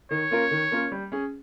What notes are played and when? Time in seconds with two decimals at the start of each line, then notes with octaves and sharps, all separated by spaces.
0.11 D#3 C#5
0.31 A#3 C#4 F4 A#4
0.51 D#3
0.71 A#3 C#4 F4 A#4
0.92 G3
1.12 C#4 G#4